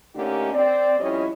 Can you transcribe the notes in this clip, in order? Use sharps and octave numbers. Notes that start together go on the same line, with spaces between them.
D3 A3 A#3 C#4 D#4 G4
C4 D5
F2 G3 C#4 E4 C#5 D#5